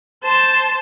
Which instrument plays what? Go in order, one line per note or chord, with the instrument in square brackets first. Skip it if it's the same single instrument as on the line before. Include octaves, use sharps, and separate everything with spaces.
[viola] C5 A5